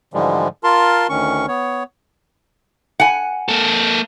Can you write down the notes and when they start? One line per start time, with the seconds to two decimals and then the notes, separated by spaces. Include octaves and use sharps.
0.14 G#2 D3 E3 F3 G3 G#3
0.64 F4 A#4 A5 C6
1.09 D2 D#3 C#4 C#6
1.48 B3 C#5
3.00 F#5 G#5
3.49 A#3 A4